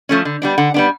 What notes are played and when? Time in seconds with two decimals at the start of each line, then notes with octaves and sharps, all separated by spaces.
0.09 F3 A3 C#4
0.25 D3
0.42 G3 B3 D4
0.58 D3 F#5
0.74 G3 B3 D4